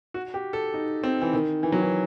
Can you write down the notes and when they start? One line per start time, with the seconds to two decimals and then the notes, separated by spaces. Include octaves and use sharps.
0.14 F#4
0.34 G4
0.53 A4
0.74 D#4
1.04 C4
1.22 E3
1.33 D#3
1.63 E3
1.72 F#3
1.82 E3